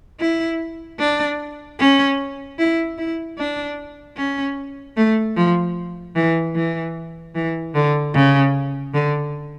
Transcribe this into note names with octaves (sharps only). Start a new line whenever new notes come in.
E4
D4
C#4
E4
E4
D4
C#4
A3
F3
E3
E3
E3
D3
C#3
D3